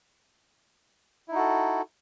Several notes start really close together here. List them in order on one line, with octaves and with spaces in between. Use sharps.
E4 D#4 F#4 A4